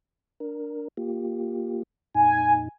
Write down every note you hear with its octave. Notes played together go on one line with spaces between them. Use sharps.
D4 A#4
A#3 F4 G4
F2 A#2 D#4 G#5